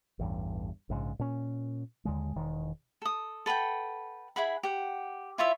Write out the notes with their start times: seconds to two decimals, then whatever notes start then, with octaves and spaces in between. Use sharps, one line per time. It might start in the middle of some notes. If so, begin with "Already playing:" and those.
0.19 A1 E2 G2
0.89 A#1 G#2 C#3
1.19 A#2 C#4
2.05 D#2 D3 G#3
2.36 E1 D#3
3.02 A4 D#6
3.46 A4 B4 F#5 G5
4.36 E4 G#4 F#5 B5
4.63 G4 F#5
5.38 E4 F4 C#5 E5